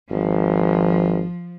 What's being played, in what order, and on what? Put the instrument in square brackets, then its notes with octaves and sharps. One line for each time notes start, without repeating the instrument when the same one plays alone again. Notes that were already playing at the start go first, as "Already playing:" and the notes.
[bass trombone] G#1 [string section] F3